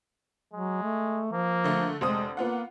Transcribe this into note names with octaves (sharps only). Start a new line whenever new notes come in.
F#3 G#3
A3
F3 A#3
D3 A3
F1 D3 G#3 C5 D#6
A#3 B3 F4 F#5